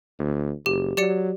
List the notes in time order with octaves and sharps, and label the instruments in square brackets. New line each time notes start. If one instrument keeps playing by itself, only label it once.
[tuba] D2
[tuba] F#1 [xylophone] G4
[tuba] F#3 [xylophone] G4 D5 C#7